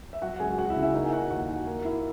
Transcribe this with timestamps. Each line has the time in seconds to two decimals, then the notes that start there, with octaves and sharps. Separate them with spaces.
0.13 E5
0.22 F#3 F#4 F#5
0.39 C#2 G#4 G#5
0.58 C#2 F#4 F#5
0.70 E4 E5
0.76 C#3
0.82 E4 E5
0.94 A#3 D#4 D#5
1.04 G#5
1.12 D#4 F#4 F#5
1.30 D#2 F#4 F#5
1.49 D#3
1.67 A#3
1.85 E4